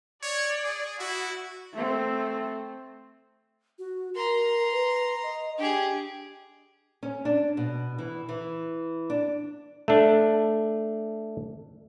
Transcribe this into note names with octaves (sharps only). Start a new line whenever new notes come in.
C#5 D5
G#4
E4 F#4
A3 C4
F#4
A#4 A#5 C6
B4
D#5
D4 G4 G#4
C#4
D4
B2
E3
E3
D4
A3 D4